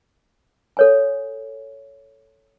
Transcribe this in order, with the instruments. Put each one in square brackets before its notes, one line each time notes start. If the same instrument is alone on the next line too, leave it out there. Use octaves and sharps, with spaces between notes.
[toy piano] A4 C#5 G#5